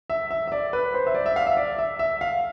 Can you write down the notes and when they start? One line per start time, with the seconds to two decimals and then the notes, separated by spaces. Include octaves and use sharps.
0.10 E5
0.31 E5
0.48 E5
0.52 D5
0.73 B4
0.94 C5
1.07 E5
1.15 D5
1.26 E5
1.36 F5
1.47 E5
1.57 D5
1.79 E5
1.99 E5
2.21 F5